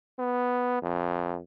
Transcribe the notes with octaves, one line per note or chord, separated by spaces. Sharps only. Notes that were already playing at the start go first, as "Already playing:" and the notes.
B3
F2